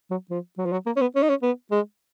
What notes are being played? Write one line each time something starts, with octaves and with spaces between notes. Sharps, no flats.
F#3
F3
F#3
F3
F#3
A#3
C#4
B3
C#4
D#4
C#4
B3
G#3